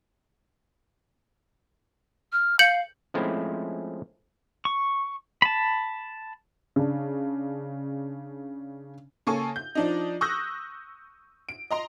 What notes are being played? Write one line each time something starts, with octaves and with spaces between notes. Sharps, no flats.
F6
F5 G6 C#7 F#7
F3 G#3 A3 C4 C#4 E4
C#6
A5 B5
C#3 D4
C#3 A#3 A4 G#5 C#6
G6
F3 D4 D#4
C#6 D#6 E6 F#6 G6 A#6
D7
D#5 A#5 C6